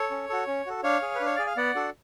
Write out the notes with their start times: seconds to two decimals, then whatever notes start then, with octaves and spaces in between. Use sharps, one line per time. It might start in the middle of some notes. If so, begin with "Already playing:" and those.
Already playing: A4 C#5
0.11 C#4
0.29 F#4 A4
0.47 C#4
0.66 F#4 A4
0.83 D4 C#5 F5
1.02 G#4
1.15 B4
1.20 D4
1.26 C#5
1.36 G#4 D5
1.47 F5
1.57 B3 D5 F#5
1.75 D4 F#4 A4